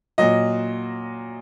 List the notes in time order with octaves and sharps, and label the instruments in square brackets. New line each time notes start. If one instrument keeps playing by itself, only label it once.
[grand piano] A#2 F#3 D#5